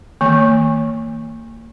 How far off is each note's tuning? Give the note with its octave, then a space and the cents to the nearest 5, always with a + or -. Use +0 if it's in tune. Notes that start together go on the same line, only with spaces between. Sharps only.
D#3 +30 A#3 -35